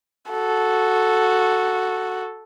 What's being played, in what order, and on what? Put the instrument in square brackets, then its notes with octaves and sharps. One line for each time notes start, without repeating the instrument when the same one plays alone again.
[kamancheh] F#4 A4